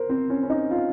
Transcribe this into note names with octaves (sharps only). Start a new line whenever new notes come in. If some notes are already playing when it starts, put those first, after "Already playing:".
Already playing: A#4 C5
C4
C#4
C#4
D#4
F4